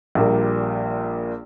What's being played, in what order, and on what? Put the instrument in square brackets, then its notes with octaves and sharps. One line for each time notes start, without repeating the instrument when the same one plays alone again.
[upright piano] A#1 A#2 G3 A#3